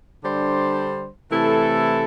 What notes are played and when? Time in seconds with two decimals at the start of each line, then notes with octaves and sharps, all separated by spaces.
0.23 D3 G3 D4 C5
1.30 C3 E3 A3 E4 A4